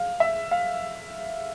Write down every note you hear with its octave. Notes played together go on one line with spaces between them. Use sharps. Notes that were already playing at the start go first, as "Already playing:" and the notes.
Already playing: F5
E5
F5